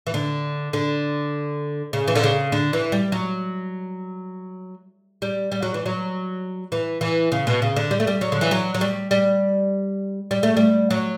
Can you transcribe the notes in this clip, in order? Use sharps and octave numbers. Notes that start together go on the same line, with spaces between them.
E3
D3
D3
C#3
E3
D3
C#3
D3
E3
G3
F#3
G3
G3
F#3
E3
F#3
E3
E3
C#3
B2
C#3
D3
G3
A3
G3
F#3
D3
E3
F#3
F#3
G3
G3
G3
A3
G3
F#3